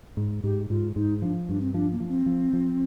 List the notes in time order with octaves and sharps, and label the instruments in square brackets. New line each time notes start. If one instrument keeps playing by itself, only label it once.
[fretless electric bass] G#2
[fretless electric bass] G#2 [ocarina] G4
[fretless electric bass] G#2 [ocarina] F4
[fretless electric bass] G#2 [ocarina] D#4
[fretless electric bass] F3 [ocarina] D4
[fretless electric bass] G2 [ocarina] D4
[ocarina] C4
[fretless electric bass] F3 [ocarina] D4
[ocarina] A#3
[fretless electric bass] F3
[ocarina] C4
[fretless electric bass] F3
F3